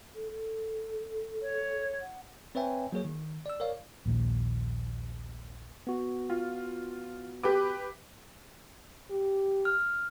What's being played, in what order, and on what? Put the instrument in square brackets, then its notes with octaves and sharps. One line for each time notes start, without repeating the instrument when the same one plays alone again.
[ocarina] A4
A4
[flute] C#5
[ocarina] F#5
[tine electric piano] C4 B4 C#5 E5 G5 G#5
F#3 A#3 G#4 C#5
D#3
D5 E6
A#4 C#5 D5 F5
[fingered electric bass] A#1 D#2 A#2
[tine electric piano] B3 F#4
[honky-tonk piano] F4
G4 B4 D6
[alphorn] G4
[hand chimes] F6